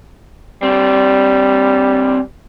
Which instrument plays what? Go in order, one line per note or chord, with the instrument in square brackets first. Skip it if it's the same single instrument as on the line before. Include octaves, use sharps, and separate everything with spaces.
[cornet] G3 [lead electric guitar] C4 D4